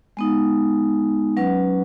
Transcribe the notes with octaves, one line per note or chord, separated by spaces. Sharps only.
G#3 B3 D#4
F#3 C#4 B4 F#5